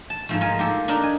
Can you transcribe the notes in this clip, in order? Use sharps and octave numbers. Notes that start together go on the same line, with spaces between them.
A5
G#2 F3 A3
F4 A#4 G#5
A#3 G4 A4
D4 D#4 A#4 D5
G#5